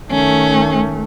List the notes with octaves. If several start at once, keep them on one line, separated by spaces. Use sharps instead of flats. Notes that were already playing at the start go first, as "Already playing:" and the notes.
D#3 A3 C#4